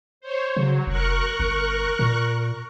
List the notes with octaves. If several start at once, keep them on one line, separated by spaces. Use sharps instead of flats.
C5 C#5
C#3 F#3
F1 A#4 C#6 F#6
G1
A#2